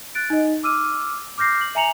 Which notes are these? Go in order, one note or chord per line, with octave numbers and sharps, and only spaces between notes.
F#6 A6 D7
D#4 D#5
D6 E6 F6 D#7
D6 F6 G6 A#6 C7
F#7
E5 G#5 A#5 C#7 F7 F#7